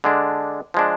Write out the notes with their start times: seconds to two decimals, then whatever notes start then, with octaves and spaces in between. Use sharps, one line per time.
0.04 D3 G#3 D4
0.74 F3 G#3 D4